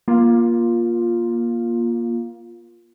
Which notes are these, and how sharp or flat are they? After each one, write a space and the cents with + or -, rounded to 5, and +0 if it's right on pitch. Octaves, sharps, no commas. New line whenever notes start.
A#3 +25 F4 +0